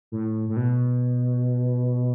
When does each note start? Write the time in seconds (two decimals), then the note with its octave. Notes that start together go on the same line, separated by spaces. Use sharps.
0.12 A2
0.49 A2
0.56 B2